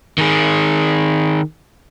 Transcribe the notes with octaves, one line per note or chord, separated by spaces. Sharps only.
D#3 G#4